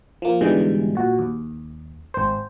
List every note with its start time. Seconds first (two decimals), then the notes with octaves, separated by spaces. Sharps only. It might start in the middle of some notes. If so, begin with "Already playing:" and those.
0.22 F3 A#3
0.41 G#2 B2 D3 E3 G3 G#3
0.95 A#2 F#4
1.19 D#2
2.14 G#1 C5